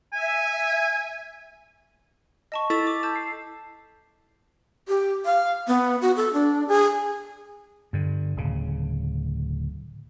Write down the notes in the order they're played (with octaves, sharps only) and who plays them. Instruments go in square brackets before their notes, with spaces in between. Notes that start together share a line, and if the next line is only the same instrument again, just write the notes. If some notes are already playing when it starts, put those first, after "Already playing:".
[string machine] E5 [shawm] G#5
[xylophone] D#5 A5 C#6
[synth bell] E4 A4 A6
[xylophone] D6
A5 E6 G6
[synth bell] C7
[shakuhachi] G4
F5
B3
F#4
A4
D4
G#4
[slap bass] G2 D3
D1 C#3